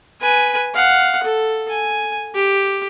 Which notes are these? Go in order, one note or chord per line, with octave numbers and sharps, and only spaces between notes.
B4 G#5
F5 F#5
A4
G#5
G4